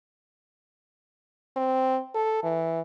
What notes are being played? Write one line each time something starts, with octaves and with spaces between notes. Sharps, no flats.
C4
A4
E3